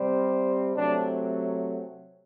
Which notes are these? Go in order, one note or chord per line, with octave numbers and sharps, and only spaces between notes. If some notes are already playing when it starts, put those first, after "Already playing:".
Already playing: C3 G3 C4
C3 F#3 A3 C4 D4